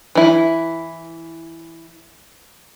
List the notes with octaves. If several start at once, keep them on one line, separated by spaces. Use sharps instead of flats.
E3 E4